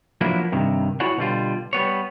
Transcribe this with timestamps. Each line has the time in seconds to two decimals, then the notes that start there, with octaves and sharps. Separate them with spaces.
0.21 F3 F#3 A#3 B3 D4 E4
0.52 G2 C3 D#3
1.00 E4 F#4 G#4 C#5 D5 F#5
1.17 B2 D3 G3 F4
1.73 G3 B3 C#5